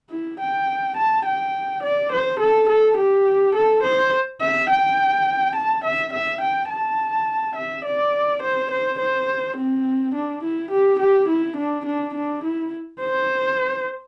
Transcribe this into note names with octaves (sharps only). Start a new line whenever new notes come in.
E4
G5
A5
G5
D5
C5
A4
A4
G4
A4
C5
E5
G5
A5
E5
E5
G5
A5
E5
D5
C5
C5
C5
C4
D4
E4
G4
G4
E4
D4
D4
D4
E4
C5